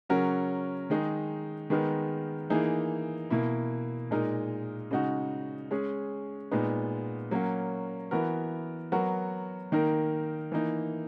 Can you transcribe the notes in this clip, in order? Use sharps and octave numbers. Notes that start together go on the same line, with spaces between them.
C#3 F#3 C#4 F#4 A#4
D#3 G#3 D#4 G#4
D#3 G#3 B3 D#4 A#4
E3 A#3 D#4 G#4
B2 A#3 E4
A#2 G#3 D#4 A#4
C#3 G#3 D#4 F#4
G#3 C#4 G#4
A#2 G#3 B3 D#4
F#3 A#3 C#4 F#4
E3 B3 F#4 A#4
F#3 B3 F#4 A#4
D#3 A#3 D#4 A#4
E3 A#3 D#4